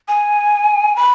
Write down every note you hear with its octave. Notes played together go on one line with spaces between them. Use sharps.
G#5
B5